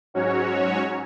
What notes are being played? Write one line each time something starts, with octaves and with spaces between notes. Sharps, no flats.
G#2 F#3 C#4 F#4 C#5